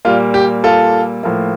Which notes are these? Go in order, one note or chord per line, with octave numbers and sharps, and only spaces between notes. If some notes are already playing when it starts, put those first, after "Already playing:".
A#2 G3 A#3 F4
G4
F4 A4
A2 F3 A#3